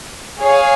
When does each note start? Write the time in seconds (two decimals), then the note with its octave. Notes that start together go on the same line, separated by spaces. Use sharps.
0.40 G#4 C#5 F5 G#5